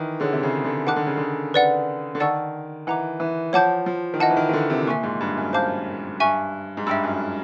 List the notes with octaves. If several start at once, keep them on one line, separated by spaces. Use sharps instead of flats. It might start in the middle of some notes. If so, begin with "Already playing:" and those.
Already playing: D#3 E3
D3 G#4 C#5 F#5
C3
C#3
D3
D#3 F#5 A5 D6 F#6
D3
C#3
D3
B4 D5 F#5
D3
D#3 D5 F#5 A5 C#6 E6
E3 D#5 F#5 A#5 D6
E3
F3 C#5 F#5 A5 D6 G6
F3
D#3
E3 D#5 F#5 A5
E3
D#3
D#3
D3
C3
A#2 E5 G#5 C#6 F#6
G#2
G2
F#2
C5 F5 A5 D6 G6
G2 E5 G#5 C#6
G#2
G2 E5 G5 B5 E6
F#2